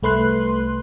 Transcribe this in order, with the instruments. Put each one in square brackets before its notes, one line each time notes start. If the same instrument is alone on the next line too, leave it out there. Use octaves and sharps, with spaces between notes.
[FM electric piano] C2 A3 B4 C6 F#6